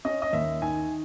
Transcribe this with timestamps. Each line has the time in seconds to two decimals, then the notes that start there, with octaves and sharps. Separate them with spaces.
0.05 C#4 D#5
0.22 D#5
0.33 D#2 E5
0.62 D#3 G#5